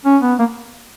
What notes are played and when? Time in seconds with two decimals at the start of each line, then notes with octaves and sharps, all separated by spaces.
0.05 C#4
0.22 B3
0.39 A#3